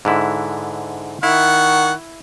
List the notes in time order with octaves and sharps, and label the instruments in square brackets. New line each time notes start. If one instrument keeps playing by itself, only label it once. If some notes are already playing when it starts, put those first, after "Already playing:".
[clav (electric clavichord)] G#2 D3 E4
[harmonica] D#3 F#5 C#6 [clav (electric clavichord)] E4